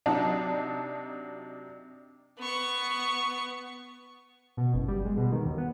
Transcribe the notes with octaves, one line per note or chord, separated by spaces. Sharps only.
C3 F#3 D4 D#4 A5
B3 C#6
B2
F#1
G3
G#3
B2
D#3
D#2
B3